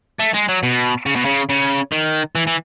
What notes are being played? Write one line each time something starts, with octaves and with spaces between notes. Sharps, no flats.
A3
G#3
F#3
B2
C#3
B2
C#3
C#3
D#3
E3
E3